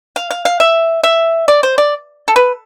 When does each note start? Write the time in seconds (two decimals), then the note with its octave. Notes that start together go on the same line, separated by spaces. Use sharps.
0.16 F5
0.31 F5
0.45 F5
0.60 E5
1.03 E5
1.48 D5
1.63 C5
1.78 D5
2.28 A4
2.36 B4